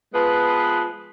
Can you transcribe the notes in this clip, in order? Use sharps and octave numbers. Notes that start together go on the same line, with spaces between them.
F3 G#3 B3 B4